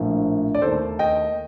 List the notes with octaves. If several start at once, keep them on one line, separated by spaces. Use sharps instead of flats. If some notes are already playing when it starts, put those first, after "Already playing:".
Already playing: A#1 A2 F3 A#3
D5
D#2 D#3 A3 A4 C5
D#5 G5